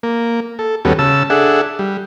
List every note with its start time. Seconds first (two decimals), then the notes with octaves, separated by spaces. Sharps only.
0.03 A#3
0.59 A4
0.85 D#2 G3 B3 C#4 F#4 A4
0.99 C#3 A5 E6
1.30 D4 G#4 A4 E5 F#5
1.79 G3